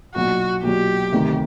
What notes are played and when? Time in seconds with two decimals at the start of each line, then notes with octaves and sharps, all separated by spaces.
0.14 B1 A#2 F#3 F#4
0.63 B1 A#2 F#3 G4
1.12 D2 C3 D#3